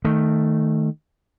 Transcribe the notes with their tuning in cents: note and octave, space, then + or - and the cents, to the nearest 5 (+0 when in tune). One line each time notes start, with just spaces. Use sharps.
D#3 +0 A3 +0